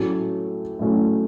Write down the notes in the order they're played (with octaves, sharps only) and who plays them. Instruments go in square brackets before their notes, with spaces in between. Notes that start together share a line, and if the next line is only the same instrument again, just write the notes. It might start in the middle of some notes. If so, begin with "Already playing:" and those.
Already playing: [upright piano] A2 F#3 A3 C#4
A2 F#3 A3 C#4